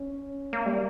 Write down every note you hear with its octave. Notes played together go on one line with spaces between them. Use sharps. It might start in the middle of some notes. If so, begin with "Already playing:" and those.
Already playing: C#4
A#3
G3